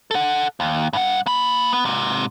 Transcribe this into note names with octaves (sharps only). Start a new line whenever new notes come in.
A4 F#5
D#2
G2 F#5
A#3 B5
B3
G#2 C3